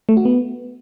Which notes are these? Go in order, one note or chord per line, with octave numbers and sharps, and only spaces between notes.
A3
F#4
B3